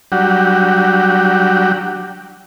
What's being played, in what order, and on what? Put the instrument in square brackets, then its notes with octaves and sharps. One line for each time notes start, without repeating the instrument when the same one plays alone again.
[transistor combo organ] F#3 G3 D4 F#4 G4